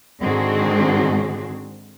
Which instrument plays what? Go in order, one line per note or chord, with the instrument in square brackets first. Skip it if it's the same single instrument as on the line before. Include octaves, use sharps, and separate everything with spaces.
[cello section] G#2 D3 D#3 C4 F#4 G#4